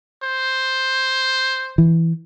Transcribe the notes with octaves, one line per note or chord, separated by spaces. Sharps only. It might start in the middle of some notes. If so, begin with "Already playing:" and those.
C5
E3